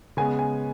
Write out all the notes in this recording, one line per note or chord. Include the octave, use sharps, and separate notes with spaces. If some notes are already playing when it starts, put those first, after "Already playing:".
C#3 G#3 B3 G#5
G#5